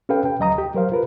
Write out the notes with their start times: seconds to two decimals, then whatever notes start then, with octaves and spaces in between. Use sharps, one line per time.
0.09 C#4 G4 A4 B4 F5 G5
0.25 G5
0.39 D2 F#3 D#5 A#5 D#6
0.58 G4
0.74 F#3 A#4 C5 F5
0.92 F4 A#4 B4